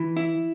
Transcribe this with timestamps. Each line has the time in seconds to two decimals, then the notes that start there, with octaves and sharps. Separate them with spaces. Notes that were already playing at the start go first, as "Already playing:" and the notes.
Already playing: E3
0.17 E4